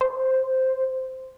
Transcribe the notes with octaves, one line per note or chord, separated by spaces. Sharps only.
C5